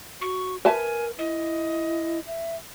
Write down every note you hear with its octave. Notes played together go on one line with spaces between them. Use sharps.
F#4 C#6
A#4 B4 E5 G#5 A5
E4 D#5
E5